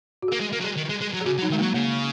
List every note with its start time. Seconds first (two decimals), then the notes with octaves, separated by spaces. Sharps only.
0.22 F#4
0.28 A#3 G#4
0.40 G#3
0.53 A#3
0.60 F#3
0.64 G#3
0.77 D#3
0.89 G#3
1.01 G#3
1.13 F#3
1.21 G#4
1.25 C#3 F#4
1.38 F#3
1.42 D#4
1.50 D#3 G#3
1.58 F#3 A#3
1.74 C#3 A#3